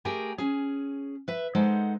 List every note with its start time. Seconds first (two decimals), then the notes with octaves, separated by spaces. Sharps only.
0.05 A3 G4 G#4 A#4 G5 G#5
0.38 C#4 G#4
1.28 B4 E5
1.55 G#3 D#4 A4 C5 F#5